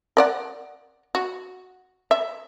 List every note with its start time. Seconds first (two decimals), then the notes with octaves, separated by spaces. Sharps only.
0.17 A#4 D5 F#5
1.15 F#4
2.11 E5